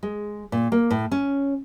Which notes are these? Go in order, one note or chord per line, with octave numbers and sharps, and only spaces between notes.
G#3
A#2
A#3
A2
C#4